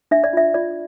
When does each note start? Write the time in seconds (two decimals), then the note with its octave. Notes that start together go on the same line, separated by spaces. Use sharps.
0.11 D4 E5
0.24 D5
0.33 F4 E5
0.54 F4 D5